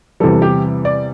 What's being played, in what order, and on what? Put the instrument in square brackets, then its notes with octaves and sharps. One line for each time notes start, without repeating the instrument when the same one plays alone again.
[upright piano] E2 C3 E3 G3 A4
G4
D5